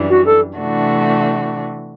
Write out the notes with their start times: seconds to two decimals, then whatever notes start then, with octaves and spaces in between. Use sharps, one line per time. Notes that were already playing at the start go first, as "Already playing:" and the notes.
Already playing: F#2 E3 G3 D4
0.10 F#4
0.26 A4
0.58 C3 E3 A3 D4 F#4